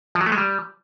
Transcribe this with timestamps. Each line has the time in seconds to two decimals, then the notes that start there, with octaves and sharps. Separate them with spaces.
0.15 F3
0.21 F#3
0.26 A3
0.32 G#3
0.38 G3